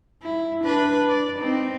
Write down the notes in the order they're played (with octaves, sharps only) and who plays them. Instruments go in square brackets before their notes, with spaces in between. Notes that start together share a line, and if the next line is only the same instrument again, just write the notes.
[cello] E4
D4 B4
D5
C4 D#4